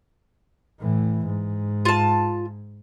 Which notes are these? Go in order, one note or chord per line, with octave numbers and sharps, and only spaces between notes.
A2 E3
G#2
F4 A5